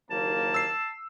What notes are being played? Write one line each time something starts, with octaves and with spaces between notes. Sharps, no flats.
F#1 D#2 A#3 A5
E6 C7